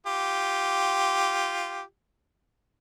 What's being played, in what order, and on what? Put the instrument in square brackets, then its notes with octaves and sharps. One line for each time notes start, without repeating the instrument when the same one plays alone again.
[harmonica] F4 G4